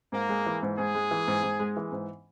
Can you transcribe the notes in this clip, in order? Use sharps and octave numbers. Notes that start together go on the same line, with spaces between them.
G#2 A#3
G#3
E3
G#2
G#2 G#4
G#3
E3
G#2
G#2
G#3
E3
G#2